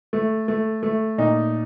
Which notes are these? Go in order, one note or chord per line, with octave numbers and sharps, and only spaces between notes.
A3
A3
A3
A#2 D#4